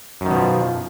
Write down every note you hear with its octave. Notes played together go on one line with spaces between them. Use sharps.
F#2 B2 D#3 F3